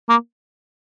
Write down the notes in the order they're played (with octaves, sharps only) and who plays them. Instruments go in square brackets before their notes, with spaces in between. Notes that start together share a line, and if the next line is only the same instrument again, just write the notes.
[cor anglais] A#3